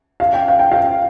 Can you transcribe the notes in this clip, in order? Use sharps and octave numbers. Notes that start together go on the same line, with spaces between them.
F5
G5
F5
G5
F5